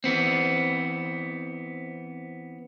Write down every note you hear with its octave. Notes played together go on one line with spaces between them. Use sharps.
E3 B3 C4